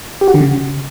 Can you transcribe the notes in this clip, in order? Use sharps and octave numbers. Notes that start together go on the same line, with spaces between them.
G4
F#4
D3
C#3